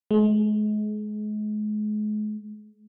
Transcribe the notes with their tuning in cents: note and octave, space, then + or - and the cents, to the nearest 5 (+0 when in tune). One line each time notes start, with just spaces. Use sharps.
G#3 +35